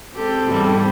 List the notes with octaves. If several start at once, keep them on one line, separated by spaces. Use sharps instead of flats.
G#3 C4 G4 A4
E2 G#2 G3